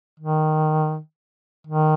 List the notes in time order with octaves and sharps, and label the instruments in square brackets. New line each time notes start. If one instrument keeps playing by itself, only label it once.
[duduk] D#3
D#3